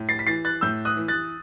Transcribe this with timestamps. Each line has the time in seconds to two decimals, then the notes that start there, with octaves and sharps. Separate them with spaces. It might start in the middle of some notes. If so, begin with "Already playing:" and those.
Already playing: A2
0.09 A6 C7
0.19 B6
0.27 E3 A6 C7
0.45 F#6 A6
0.61 A2 E6 G6
0.85 D#6 F#6
0.96 E3
1.08 F#6 A6